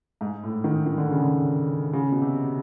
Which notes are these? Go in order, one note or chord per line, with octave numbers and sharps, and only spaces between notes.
G#2
A2
D#3
D#3
D3
C#3
D3
C#3
B2
C3